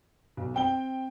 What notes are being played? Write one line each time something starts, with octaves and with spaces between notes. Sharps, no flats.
B1
C4 G5 G7